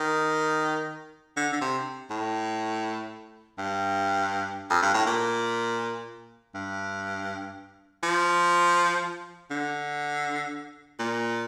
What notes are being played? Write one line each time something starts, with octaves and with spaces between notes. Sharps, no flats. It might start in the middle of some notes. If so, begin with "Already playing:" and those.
Already playing: D#3
D3
D3
C3
A2
G2
F2
G2
A2
A#2
G2
F3
D3
A#2